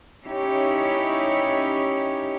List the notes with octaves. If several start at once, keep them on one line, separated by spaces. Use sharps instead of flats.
C#4 D#4 E4 G4 C#5